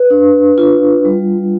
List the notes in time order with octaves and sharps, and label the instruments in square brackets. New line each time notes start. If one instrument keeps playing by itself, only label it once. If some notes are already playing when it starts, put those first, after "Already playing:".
Already playing: [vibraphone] B4
D4
F4
G3